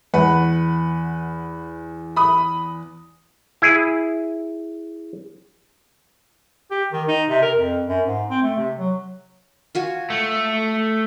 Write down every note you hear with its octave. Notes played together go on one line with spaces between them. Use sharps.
E2 B4 F#5
B5 D#6
E4 G#4
G4
D#3
D#4
C3
A#4
F2
F#2
G#2
C4
A3
C3
F#3
F4 F#4 G#5
A3